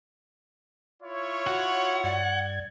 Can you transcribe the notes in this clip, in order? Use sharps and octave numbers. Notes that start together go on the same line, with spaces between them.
E4 F4 C#5
F#4 F#5
G2 D5 G#6